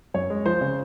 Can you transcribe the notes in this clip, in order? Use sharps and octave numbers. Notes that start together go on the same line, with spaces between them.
F#2 C#5
G#3
F3 C5
C#3